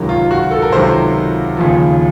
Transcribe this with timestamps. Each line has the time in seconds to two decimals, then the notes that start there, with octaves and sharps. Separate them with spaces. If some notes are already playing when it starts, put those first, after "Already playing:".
Already playing: C#2 C3 D#3 F#3
0.09 F4
0.31 F#4
0.51 A4
0.62 A#4
0.72 C#2 C3 D#3 F#3 C5
1.57 D#2 C#3 F3